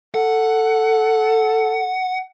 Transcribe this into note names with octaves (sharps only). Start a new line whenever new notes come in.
A4 F#5